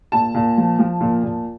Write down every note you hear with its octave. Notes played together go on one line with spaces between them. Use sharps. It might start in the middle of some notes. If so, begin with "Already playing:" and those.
A#2 A5
A#2
F3
F3
A#2
A#2